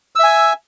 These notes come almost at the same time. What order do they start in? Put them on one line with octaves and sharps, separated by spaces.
E6 E5 G#5